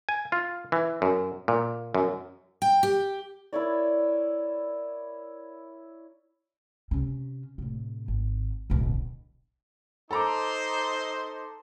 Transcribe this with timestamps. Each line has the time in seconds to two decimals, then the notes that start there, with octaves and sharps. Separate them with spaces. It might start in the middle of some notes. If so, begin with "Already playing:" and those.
0.09 G#5
0.32 F4
0.72 E3
1.02 F#2
1.48 A#2
1.95 F#2
2.62 G5
2.83 G4
3.53 E4 A#4 C#5 D5
6.91 C3 C#4
7.58 A2 C3
8.08 G#1
8.70 D1 B1
10.11 D#4 A4 C5 A#5 C6 D6